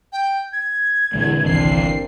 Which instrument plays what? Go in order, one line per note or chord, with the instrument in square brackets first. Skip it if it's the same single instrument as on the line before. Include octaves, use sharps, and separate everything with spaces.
[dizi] G5
G#6
[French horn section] E2 [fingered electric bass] A#2 D3 G#3
[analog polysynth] G1 C7 [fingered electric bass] C2 D#3 E3 [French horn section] A#3 C4 D4